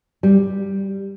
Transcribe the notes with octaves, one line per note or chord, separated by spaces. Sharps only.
G3